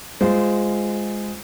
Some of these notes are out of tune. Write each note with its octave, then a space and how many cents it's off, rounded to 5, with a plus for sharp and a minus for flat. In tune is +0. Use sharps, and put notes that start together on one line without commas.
G#3 +0 F4 +0 C5 -25